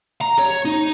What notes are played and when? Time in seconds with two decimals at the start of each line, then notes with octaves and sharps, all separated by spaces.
0.21 A#5
0.39 C#5
0.65 D#4